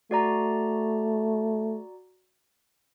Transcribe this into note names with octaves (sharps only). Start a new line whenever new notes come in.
A3 F#4 D5 A#5